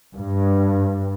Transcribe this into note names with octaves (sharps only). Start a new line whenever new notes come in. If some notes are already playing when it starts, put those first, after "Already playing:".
G2